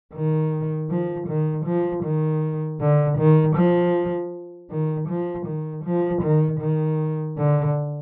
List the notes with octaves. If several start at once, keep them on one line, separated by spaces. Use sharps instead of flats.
D#3
F3
D#3
F3
D#3
D3
D#3
F3
D#3
F3
D#3
F3
D#3
D#3
D3